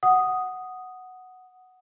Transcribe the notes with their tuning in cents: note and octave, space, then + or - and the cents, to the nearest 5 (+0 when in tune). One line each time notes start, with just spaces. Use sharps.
F#5 +0 D#6 +0